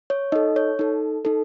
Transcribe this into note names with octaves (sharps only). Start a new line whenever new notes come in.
C#5
D#4 A4 D#5
C#5
D#4 A4
D#4 A4